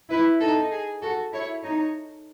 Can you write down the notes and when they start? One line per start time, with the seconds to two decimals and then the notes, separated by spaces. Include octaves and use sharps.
0.10 E4 B4
0.40 D#4 A4
0.71 G#4
1.02 F#4 A4
1.33 E4 C#5
1.63 D#4 C#5